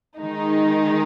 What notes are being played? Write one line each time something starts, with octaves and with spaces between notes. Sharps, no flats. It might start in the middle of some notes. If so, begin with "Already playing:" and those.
D#3 G#3 D#4